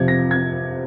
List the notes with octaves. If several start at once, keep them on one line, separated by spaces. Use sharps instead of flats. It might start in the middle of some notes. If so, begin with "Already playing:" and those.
Already playing: F2 C3 F3 G#6
A#6
G#6